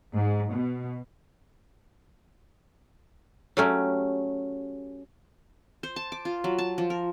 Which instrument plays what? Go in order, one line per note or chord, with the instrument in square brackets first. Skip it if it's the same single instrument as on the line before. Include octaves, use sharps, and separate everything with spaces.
[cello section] G#2
B2
[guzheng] F#3 A3 C#4 G4
[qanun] C5
A5
D6
F4
F#3
A5
F3
A#4